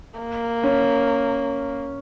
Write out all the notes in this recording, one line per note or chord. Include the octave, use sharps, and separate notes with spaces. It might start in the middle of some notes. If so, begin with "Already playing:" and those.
A#3
C#4